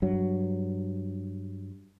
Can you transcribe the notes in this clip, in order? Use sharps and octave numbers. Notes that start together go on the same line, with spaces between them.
G2 F#3